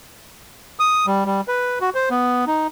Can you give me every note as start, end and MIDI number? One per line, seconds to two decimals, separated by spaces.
0.80 1.06 87
1.07 1.25 55
1.25 1.41 55
1.48 1.79 71
1.81 1.90 66
1.95 2.09 72
2.10 2.45 59
2.47 2.67 63